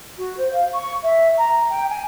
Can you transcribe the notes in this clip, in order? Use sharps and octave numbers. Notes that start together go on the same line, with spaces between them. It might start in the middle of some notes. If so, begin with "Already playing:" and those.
F#4
C5
F5
C#6
E5
A#5
G5
G#5